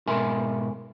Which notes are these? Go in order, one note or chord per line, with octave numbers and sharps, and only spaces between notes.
G#2 B2 A#4 E5 G#5 C6